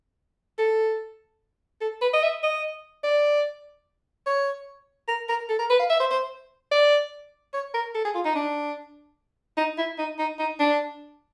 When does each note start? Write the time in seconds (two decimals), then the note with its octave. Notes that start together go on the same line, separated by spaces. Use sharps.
0.58 A4
1.81 A4
2.01 B4
2.14 D#5
2.23 E5
2.43 D#5
3.04 D5
4.26 C#5
5.08 A#4
5.29 A#4
5.49 A4
5.59 A#4
5.70 B4
5.79 F5
5.90 E5
6.00 C5
6.11 C5
6.71 D5
7.54 C#5
7.74 A#4
7.95 A4
8.05 G#4
8.15 F4
8.25 D#4
8.35 D4
9.57 D#4
9.78 E4
9.98 D#4
10.19 D#4
10.39 D#4
10.59 D4